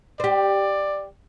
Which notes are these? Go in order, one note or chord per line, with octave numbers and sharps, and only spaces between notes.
G4 C5 D5